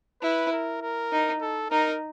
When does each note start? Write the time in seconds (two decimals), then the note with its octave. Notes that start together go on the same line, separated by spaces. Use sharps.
0.22 E4 B4
0.52 A#4
0.82 A#4
1.12 D#4
1.41 A4
1.71 D#4 A#4